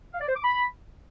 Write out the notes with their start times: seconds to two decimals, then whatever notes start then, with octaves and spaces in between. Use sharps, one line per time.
0.13 F5
0.21 D5
0.29 C5
0.36 D6
0.44 B5